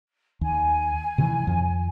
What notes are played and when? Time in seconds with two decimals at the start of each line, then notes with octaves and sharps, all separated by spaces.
0.41 D#2 G#5
1.18 C3 D#3 E3
1.47 F2 F3